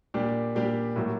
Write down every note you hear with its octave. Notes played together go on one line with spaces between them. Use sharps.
A#2 G3 D4 G4
A#2 G3 D4 G4
A2 F#3 A#3